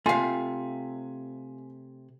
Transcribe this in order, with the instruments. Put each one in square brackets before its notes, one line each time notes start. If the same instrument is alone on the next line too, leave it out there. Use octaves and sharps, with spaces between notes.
[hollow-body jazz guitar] C3 A3 [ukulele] F4 F5 [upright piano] G#5